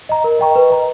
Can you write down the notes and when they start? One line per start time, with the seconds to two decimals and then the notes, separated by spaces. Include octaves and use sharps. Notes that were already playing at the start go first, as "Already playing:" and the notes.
0.09 D#5 A#5
0.24 A#4
0.39 D#5 G5 A#5 C#6
0.56 B4
0.71 D#5 A#5